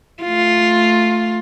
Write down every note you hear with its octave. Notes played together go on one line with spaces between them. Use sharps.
A3 F4